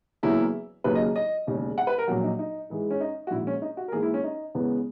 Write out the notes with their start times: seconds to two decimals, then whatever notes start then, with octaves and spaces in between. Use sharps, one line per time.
0.23 E2 C#3 F#3 A#3 C#4 E4
0.84 D#2 C#3 F#3 A#3 B4
0.95 D#5
1.16 D#5
1.47 E1 D#2 C#3
1.78 F#5
1.87 B4
1.98 A#4
2.08 A#1 A#2 F#3 F#4
2.24 D#4
2.39 D#4
2.70 G#2 E3 G#3
2.90 C#4
3.01 D#4
3.27 F#4
3.31 A#1 G#2 D#3 E4
3.47 C#4
3.62 D#4
3.77 F#4
3.88 A#4
3.92 G#2 E3 A#3 G#4
4.03 E4
4.14 C#4
4.24 D#4
4.55 E2 C#3 G#3 B3